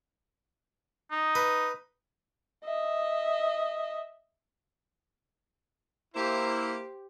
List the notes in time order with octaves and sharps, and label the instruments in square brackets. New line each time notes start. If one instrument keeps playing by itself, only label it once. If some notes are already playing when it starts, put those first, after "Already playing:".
[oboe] D#4
[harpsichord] B4
[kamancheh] D#5 E5
[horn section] A#3 E4 [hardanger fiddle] G4 C5